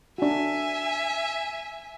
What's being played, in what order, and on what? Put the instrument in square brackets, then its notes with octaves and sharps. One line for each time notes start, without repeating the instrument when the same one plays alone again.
[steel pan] D4 F#4 [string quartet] E5 G#5